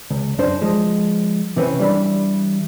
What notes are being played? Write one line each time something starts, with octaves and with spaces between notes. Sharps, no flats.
C#2
F#2 D4 D#4 C5
F3 G#3
C3 E3 C4 C#4 G#4 B4
E3 G3 D4 B5